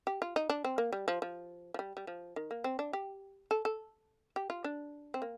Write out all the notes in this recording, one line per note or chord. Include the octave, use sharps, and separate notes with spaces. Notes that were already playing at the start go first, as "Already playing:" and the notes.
G4
F4
D#4
D4
C4
A#3
G3
F3
F3
F3
G3
G3
F3
D#3
A#3
C4
D4
G4
A4
A4
G4
F4
D4
C4
A#3